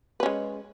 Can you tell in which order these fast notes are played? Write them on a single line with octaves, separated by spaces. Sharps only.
B4 C#4 G#3